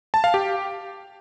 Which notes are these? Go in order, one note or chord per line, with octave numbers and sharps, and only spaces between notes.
A5
F5
G4